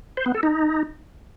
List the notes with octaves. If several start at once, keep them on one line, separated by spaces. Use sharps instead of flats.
C5
B3
A4
D#4